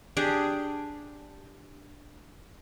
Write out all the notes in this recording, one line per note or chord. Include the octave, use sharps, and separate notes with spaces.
D4 G4 G#4